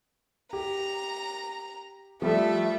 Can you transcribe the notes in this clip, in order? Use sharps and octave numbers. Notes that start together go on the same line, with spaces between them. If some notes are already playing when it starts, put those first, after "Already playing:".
G4 A#5
F3 G3 A3 A4 E5